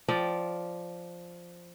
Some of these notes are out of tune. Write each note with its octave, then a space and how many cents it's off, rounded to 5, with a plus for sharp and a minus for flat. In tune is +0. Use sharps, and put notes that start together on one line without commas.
F3 +0 D5 +0 G5 -10